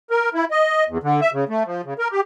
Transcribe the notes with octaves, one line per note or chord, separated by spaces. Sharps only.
A#4
E4
D#5
E2
D3
E5
C#3
A3
F3
C#3
A#4
G4